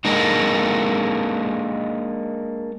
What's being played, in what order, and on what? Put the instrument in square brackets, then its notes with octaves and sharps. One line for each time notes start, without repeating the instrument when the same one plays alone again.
[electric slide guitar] G#3 A#3 D4 D#4